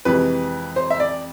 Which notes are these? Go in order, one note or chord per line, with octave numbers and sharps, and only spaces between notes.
F2 C3 E3 G#3 B4
C5
E5
D5